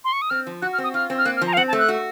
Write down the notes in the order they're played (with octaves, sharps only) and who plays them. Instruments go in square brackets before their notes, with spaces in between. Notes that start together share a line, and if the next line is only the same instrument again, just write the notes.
[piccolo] C6
C#6
D#6
[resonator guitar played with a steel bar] C4 [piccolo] F6
[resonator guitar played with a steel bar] F3
[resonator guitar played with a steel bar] F#4 [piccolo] F#6
[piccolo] F6
[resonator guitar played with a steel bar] C4
[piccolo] D#6
[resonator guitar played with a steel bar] F4 [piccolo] F6
[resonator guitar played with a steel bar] C4
[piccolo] F6
[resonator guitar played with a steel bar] A#3 [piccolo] F#6
[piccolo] F6
[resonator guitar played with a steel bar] F3
[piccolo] A#5
F5
[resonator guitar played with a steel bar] C4 [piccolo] F#5
[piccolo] A5
[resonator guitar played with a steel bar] A3
[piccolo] F#6
[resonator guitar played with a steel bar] F#4